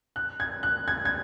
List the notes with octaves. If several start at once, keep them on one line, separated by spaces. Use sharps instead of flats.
F#6
G#6
F#6
G#6
G#6